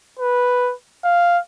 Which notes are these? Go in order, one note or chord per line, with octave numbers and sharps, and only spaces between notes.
B4
F5